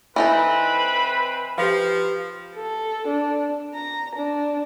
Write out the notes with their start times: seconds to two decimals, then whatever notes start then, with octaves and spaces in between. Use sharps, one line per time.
0.16 E3 C4 D#4 A4 B4 B5
1.58 F3 G4 B4 F5
2.55 A4
3.06 D4
3.73 A#5
4.15 D4